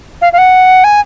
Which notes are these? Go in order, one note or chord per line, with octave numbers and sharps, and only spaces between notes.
F5
F5
F#5
G#5